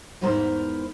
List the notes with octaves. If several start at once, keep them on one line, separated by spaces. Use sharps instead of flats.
E2 G#2 E4 A#4 C5